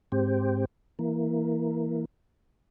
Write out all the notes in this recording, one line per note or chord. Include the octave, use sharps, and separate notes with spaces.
G#2 C4 G4
E3 A#3